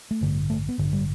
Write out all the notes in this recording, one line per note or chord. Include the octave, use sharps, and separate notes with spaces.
A3
A1 G2 D3
A3
B3
A1 G2 D3
G3